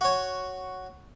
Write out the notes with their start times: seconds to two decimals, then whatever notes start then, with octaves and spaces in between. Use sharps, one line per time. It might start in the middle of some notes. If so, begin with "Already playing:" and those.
0.01 F#4 C#5